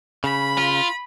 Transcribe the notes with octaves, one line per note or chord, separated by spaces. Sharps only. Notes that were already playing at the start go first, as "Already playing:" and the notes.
C#3 B5
F4